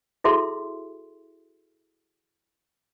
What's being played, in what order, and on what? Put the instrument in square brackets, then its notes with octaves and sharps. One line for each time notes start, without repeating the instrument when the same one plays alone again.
[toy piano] E4 F#4 G#4 A4 E5 C6